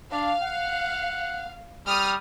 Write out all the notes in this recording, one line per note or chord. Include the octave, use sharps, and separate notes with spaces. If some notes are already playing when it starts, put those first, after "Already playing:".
D4 F5
F#5
G3 D#6 F6